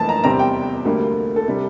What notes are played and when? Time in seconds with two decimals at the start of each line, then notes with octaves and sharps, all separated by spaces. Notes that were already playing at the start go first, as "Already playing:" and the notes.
Already playing: F1 F2 E3 A#3 A5
0.09 A#5
0.24 E2 C3 G3 C4 A#5
0.39 G5
0.85 D2 D3 G3 A#3
1.36 A4
1.48 C3 G3